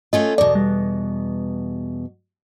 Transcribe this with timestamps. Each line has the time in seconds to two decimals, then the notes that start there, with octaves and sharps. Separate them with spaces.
0.13 A3 C#4 F4 D#5
0.38 E2 B2 D5
0.55 G3